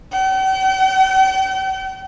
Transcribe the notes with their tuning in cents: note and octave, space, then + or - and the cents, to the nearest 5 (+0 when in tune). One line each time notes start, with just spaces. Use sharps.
G5 -45